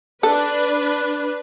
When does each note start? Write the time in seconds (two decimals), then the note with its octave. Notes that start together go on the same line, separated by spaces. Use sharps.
0.23 D4 A4 B4